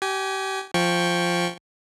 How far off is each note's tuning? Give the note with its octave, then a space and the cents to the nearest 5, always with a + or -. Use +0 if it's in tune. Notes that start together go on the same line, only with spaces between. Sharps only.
G4 -30 G#5 +0
F3 +0 G5 +5 C#6 +0